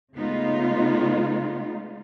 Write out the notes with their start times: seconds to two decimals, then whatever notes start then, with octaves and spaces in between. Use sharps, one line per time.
0.15 C#3 G#3 A3 B3 D#4 F4